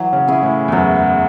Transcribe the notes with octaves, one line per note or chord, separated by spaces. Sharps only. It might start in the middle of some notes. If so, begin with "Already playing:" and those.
Already playing: E3 F#3
C#3
C#4 E4 G#4
A2
E2
F#2 F#3